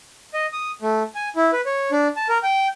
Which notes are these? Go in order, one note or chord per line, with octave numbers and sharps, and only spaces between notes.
D#5
D#6
A3
G#5
E4
B4
C#5
D4
A5
A#4
G5